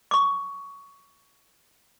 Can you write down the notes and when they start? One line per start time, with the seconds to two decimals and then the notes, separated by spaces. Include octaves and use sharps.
0.11 C#6 D6